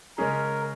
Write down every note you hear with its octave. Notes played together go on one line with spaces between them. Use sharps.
C#3 G#3 C#4 G#4 A#4